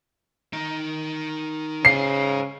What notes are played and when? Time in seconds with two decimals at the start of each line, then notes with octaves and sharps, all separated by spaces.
0.53 D#3 D#4
1.85 C#3 G#4 C5 C7